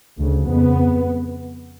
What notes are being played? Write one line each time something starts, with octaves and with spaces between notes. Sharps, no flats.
D2 C#3
F2 C#3 B3